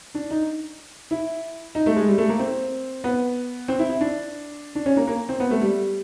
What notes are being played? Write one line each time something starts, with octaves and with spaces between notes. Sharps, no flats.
D4
D#4
E4
D#4
A3
G#3
G3
A3
A#3
C4
B3
C4
E4
E4
D4
D4
C#4
A#3
A#3
C4
B3
A3
G3